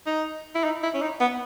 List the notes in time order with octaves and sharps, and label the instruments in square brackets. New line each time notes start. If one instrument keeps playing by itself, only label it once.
[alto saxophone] D#4
E4
D#4
E4
C#4
D#4
B3